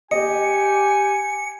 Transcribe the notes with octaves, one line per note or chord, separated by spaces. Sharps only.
G4 D#5 G#5 C#7